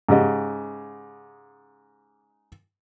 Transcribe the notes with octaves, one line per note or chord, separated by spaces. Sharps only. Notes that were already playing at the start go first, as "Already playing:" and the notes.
G#2 C#3 G4 D#5